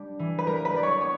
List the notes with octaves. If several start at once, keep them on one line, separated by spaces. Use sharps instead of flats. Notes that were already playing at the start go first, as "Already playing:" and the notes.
Already playing: G3 D4
E3
B4
G3 A#4
B4
G3 D5
C#5
B3 C#5